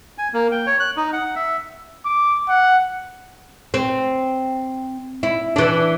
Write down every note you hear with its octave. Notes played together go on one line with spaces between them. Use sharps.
G#5
A#3
G5
C#5
F#6
D#4
F#5
E5
D6
F#5
C4
E4
E3 D4